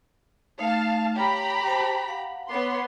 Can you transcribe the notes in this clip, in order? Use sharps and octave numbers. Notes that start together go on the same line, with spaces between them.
A3 D#4 F5 A5
G4 C#5 A#5 B5
C5 G5 A5
F5 F#5
B3 C#5 C6 D6